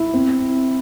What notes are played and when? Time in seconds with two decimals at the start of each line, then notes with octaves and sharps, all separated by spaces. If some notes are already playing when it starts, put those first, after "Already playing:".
Already playing: E4
0.14 C4